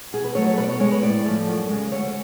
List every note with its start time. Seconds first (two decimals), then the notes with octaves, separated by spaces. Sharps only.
0.13 B2 G#4
0.24 B4
0.35 F#3 A3 C#5
0.46 C#5
0.58 B2 B4
0.64 D5
0.69 C#5
0.80 G#3 C#5
0.92 B4
1.02 A2 D5
1.26 F3 A3
1.47 F#2
1.69 C#3 G#3
1.92 D2 C#5